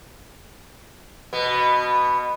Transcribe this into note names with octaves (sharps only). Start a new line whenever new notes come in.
B2 B3